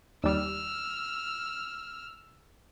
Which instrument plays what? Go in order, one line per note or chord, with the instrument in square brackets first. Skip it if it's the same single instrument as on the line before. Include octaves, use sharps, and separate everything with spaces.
[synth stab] D#2 G3 [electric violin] E6 F6